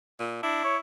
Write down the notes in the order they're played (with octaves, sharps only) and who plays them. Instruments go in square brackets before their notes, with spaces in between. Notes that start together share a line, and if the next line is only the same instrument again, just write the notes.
[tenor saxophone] A#2
[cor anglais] D4 [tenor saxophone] E4
[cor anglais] C#5